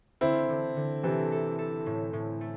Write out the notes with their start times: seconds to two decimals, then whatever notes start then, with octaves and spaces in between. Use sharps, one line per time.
0.21 D3 C4 E4
0.50 D3
0.76 D3
1.03 C3 E3 A4
1.32 A4
1.59 A4
1.86 A2
2.13 A2
2.41 A3